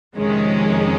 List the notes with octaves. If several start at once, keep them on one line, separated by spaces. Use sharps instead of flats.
F2 C3 D#3 G#3 C#4